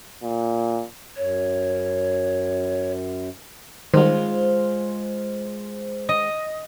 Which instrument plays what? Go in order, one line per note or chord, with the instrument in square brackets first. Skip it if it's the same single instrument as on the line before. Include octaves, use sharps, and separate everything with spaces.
[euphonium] A#2
[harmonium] F#2 [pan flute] C#5
[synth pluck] D#3 G3 [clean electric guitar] G#3 F4 [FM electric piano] C5
[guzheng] D#5